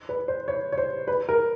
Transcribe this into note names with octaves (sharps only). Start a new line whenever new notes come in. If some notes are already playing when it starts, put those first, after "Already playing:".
B4
C5
C#5
C#5
C5
B4
A#4